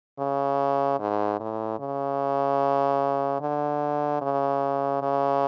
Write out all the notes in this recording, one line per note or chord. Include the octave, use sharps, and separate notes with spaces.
C#3
G#2
A2
C#3
D3
C#3
C#3